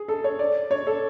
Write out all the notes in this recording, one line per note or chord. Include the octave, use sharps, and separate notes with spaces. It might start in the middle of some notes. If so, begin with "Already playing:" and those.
Already playing: G#4
A4
C#5
D5
C#5
A4